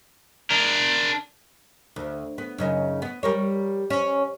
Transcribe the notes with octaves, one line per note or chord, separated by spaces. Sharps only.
D4 A#4
D2
B3
F#2 C#3 D#4
B3
G3 A#4 C#5
C#4